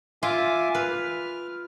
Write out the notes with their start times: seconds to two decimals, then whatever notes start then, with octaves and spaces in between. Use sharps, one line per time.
0.23 F4 E5 G#5 D6
0.75 B4 F6